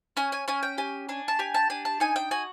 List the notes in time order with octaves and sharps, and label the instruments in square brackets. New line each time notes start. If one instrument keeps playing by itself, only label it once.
[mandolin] C#4 G#5
G#5
C#4 G#5
G5
G4 G#5
D4 G#5
A5
G4 G#5
A5
D4 G#5
A5
D#4 G#5
G5
F#4 G#5